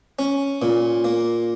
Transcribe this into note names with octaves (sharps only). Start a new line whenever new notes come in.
C#4
A#2
A#3